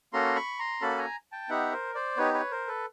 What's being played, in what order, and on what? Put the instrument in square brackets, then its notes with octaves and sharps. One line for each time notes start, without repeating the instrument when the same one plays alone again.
[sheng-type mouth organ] A#3 C#4 F#4 A4 A#5 C6
B5 C#6
A#5 C6
A#3 C#4 F#4 A4 A5 B5
G#5 A#5
G5 A5
B3 D#4 G4 E5 F#5
A#4 C5
C5 D5
B3 D#4 G4 B4 C#5
B4 C#5
A#4 C5
A4 B4